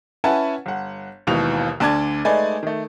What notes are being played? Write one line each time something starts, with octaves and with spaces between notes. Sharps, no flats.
C#4 E4 B4 F#5 G#5 A5
G1 F#5
G#1 D#2 B2 E3 F7
D2 D3 D5 A5 D6 G#6
G#3 A3 D#4 B4 D5 G#5
D#3 A3